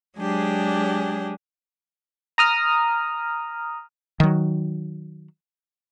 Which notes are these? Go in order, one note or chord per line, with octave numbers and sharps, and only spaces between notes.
F#3 G#3 D4 G4 G#4
A#5 D#6 F6
D#3 F#3